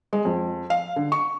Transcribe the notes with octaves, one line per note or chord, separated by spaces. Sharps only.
G#3
F2
F5
D3
C#6